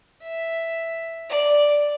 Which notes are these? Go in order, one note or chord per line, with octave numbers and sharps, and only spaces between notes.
E5
D5